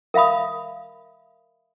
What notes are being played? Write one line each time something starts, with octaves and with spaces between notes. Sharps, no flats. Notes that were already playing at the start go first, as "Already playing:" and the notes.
A#4 E5 F5 B5 D#6